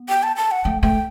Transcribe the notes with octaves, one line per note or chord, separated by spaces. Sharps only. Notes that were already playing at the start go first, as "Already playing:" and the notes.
Already playing: B3
G5
A5
A5
F#5
A3 G5
A3 G5